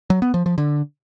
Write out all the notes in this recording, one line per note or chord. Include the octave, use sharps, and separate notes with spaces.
F#3
B3
F3
F3
D3